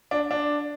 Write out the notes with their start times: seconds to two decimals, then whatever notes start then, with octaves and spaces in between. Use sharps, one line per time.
0.11 D4
0.31 D4